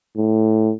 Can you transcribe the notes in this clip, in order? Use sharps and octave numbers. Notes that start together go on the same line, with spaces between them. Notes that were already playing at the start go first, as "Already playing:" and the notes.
A2